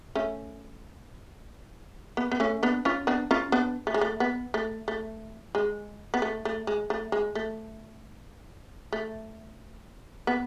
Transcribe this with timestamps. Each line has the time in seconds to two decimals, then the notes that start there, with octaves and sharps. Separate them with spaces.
0.15 A3 C#4
2.17 B3
2.32 B3
2.40 A3 C#4
2.63 B3 D4
2.85 C#4 F4
3.07 B3 D4
3.31 C#4 F4
3.52 B3 D4
3.87 A3
3.94 G#3
4.01 A3
4.20 B3
4.54 A3
4.88 A3
5.55 G#3
6.14 B3
6.22 A3
6.45 A3
6.67 G#3
6.90 A3
7.12 G#3
7.35 A3
8.92 A3
10.27 B3